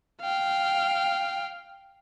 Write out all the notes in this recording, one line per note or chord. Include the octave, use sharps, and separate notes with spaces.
F5 G5